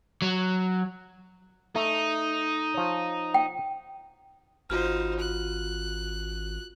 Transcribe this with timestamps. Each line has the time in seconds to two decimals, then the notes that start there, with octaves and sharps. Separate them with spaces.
0.22 F#3
1.76 A3 D#4
2.74 F3 C#5
3.34 G5
4.70 G#1 D#4 F4 F#4 C5 F6
5.19 F#6